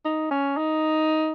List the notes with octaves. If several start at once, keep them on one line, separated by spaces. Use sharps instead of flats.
D#4
C#4
D#4